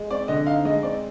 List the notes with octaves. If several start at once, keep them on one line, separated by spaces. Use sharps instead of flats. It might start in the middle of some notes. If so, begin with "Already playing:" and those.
Already playing: G#3
C4 D5
D3 D#5
D#4 F5
G#3 D#5
C4 D5